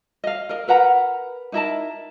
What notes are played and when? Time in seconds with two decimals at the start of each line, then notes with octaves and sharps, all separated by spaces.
0.24 D#5 F5
0.49 A#4 D#5
0.68 A#4 B4 F#5 A#5
1.52 D#4 E4 A#4 A5